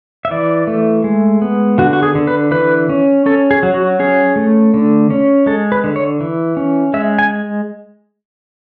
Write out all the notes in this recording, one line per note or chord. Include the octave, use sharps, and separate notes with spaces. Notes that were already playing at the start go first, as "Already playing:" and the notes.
E5
E3 D5
A3
G#3
B3
D3 F#4
F#4
G#4
D3
B4
E3 B4
C#4
C#4 A4
G#4
F#3
F#4
C#4 G#4
A3
D3
C#4
G#3 A4
B4
D3
C#5
E3
C#4
G#3 E5
G#5